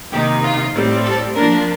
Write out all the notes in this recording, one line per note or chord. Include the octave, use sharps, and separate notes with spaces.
C3 D#3 A#3 D#4 G4
F4
A2 G3 C4
A4
F3 A#3 D4 A#4